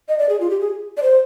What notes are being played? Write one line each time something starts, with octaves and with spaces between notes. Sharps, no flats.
D#5
D5
G#4
F4
G4
G#4
D5
C5